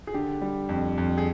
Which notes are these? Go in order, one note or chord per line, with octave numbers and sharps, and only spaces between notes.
G#4
D3 G4
G3
F2
F2
G#4